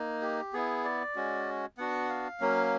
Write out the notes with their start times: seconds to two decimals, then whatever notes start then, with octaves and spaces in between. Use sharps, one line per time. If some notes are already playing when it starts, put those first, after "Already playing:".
Already playing: A#3 D#4
0.22 G4
0.53 B3 E4 G#4
0.84 D5
1.16 G#3 C#4 F#4
1.78 B3 D4 F#4 F#5
2.09 F5
2.41 F#3 A#3 C#4